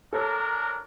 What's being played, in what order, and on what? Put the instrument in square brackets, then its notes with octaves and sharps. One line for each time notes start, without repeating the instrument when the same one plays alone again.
[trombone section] A1 D4 A#4 [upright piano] A4 C#5 E6